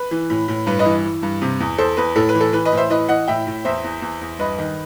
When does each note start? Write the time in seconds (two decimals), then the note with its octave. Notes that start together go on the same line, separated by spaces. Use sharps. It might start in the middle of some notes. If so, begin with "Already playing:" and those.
Already playing: B4
0.11 E3
0.30 A2
0.48 A2
0.67 G2 B4
0.79 B4 D#5
0.85 E3
1.04 E3
1.23 G2
1.42 C3
1.60 E2
1.78 E2 A4 C5
1.97 E2 B4
2.15 A2 A4
2.29 B4
2.35 E3
2.41 A4
2.53 E3 B4
2.65 B4 D#5
2.72 A2
2.77 C5 E5
2.90 E3 B4 D#5
3.09 E3 D#5 F#5
3.28 A2 E5 G5
3.47 A2
3.65 E2 C5 E5
3.84 E2
4.02 E2
4.21 E2
4.39 G2 B4 D#5
4.58 D#3